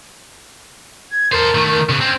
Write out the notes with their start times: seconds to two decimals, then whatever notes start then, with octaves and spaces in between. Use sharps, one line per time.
1.11 G#6
1.32 A4 A#4 C5
1.55 D#3 A3
1.89 C#3 B3
2.01 C4 C#4